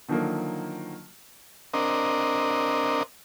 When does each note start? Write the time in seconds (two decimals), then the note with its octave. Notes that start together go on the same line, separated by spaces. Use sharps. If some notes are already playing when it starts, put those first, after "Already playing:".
0.08 D3 D#3 F3 F#3 A#3
1.74 C4 D4 A#4 D#5